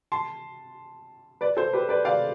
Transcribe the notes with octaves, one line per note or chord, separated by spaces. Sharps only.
A5 C6
B4 D5
A4 C5
G4 B4
B4 D5
D5 F5